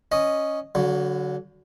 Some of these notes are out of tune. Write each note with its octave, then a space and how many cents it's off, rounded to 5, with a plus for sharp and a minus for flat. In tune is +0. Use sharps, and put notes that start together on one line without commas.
C#4 +0 D#5 -5
D3 -35 F#3 +0